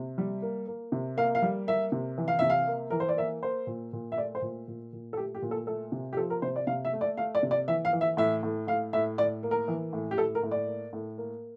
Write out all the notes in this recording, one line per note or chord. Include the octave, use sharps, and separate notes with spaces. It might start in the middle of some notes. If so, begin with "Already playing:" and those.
Already playing: C3
G3
A#3
A#3
C3
A#3 F5
F5
G3
A#3 E5
C3
E3
F5
C3 E5
F5
A#3
E3 A#4
C5
D5
A#3 E5
A#3 C5
A#2
A#2
E5
A3 D5
C5
A#2
A#2
A#2
A4
A3 G4
G4
A#2
A4
A3 A4
C3
G4
F3 A4
A#4
C3 C5
D5
C3 F5
E5
A3
D5
A3 F5
D5
C3
D5
E3 E5
F5
E3
E5
A2 E5
A2
A2 F5
A2 E5
A2 D5
A#3
A#4
E3
A2
G4
A2 A4
A#4
A2
D5
A#3
A2
A#3